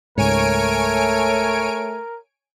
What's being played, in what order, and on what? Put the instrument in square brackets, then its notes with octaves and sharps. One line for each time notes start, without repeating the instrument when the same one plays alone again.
[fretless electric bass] C#2 G#2 [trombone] A3 [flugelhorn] A#4 [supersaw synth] C#5 G#5 D7